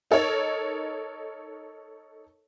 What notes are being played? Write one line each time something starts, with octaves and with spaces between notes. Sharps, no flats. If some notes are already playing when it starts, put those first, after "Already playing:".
D#4 A4 A#4 C#5